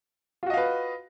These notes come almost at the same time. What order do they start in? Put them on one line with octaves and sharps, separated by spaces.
F4 F#4 D#5 F5 B4